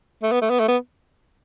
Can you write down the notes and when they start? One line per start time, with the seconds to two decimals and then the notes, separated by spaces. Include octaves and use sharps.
0.23 A3
0.32 B3
0.41 A3
0.50 B3
0.59 A3
0.68 B3